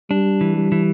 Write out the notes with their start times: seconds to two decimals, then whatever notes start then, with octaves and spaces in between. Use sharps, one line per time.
0.10 G3 D4
0.41 E3
0.57 G3
0.72 E3